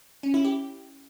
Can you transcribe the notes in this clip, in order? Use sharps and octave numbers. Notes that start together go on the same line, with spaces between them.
C#4
E4
G4